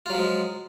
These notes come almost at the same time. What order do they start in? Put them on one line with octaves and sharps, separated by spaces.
F4 F#3 F3 G#3